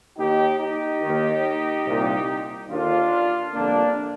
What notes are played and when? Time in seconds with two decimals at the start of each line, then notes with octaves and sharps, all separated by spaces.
0.17 D#2 D#3 D#4 G4
0.60 D#4 G4
1.02 D#2 D#3
1.85 C2 A#2
2.69 D#2 D3 D4 F4
3.53 G1 F2 D3 A#3 D4